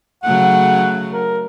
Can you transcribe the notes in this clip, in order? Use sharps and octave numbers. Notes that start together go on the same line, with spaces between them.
C#3 F#3 A3 F#5
A#4